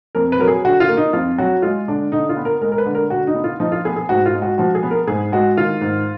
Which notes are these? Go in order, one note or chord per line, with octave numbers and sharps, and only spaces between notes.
F2 A#4
B4
F#3 A#4
G#4
D3 F#4
F4
A#3
D#4
F2 F4
F#3 F#4
G#3 F4
D3 D4
D3 D#4
F4
B3
A#4
G#3 A#4
A#4
B4
D3
A#4
D3 F#4
D#4
B3
F4
F3 D#4
F4
B3 G#4
G#4
G#2 F#4
F4
G#3
F#4
F3 F#4
G#4
B3
A#4
G#2 G#4
G#3 F#4
D#3 F4
G#2